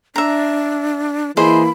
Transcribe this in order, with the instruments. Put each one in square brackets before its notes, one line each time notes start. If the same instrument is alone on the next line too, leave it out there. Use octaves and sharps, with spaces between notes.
[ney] D4 [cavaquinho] E5 A#5
[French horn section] E3 A#3 E4 [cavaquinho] G#4 C5 D#5 [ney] B5